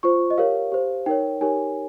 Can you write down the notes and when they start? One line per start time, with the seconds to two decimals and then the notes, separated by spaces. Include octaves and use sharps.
0.03 F4 C5 C#6
0.30 D#5
0.38 G4 A#4 C#5 F5
0.72 G4 C5
1.06 D#4 A#4 C#5 G5
1.41 D#4 G4 A#4 C#5 G#5